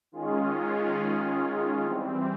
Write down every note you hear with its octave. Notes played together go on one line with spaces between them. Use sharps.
D#3 G#3 C#4 F4 G#4
E3 G3 C4